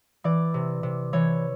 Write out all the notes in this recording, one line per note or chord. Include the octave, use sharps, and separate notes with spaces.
E3 D5
C3
C3
E3 C#5